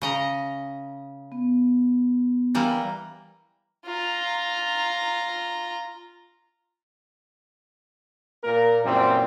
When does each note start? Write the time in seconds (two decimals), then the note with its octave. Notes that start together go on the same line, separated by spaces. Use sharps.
0.02 C#3 D#5 A#5
1.32 B3
2.55 E3 G3 A#3
3.87 F4 A#5
8.44 A#2 A#3 A#4
8.84 F#2 A#2 E3 G3 C4